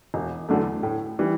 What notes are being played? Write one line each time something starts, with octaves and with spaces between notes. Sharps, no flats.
E1
E2 D3 F#3 A3
A2
E3 G3